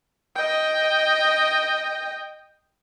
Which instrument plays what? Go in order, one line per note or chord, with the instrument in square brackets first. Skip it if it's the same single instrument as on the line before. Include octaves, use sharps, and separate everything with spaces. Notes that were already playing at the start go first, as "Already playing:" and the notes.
[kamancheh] D#5 G5